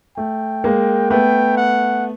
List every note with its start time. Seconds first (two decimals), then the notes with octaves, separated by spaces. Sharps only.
0.17 A3 G5
0.64 G#3 A#3
1.10 A3 B3 G5
1.57 F#5